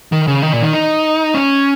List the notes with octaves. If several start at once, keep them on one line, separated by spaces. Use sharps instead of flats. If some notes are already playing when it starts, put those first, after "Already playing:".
D#3
C#3
D#3
A#2
D#3
D#4
C#4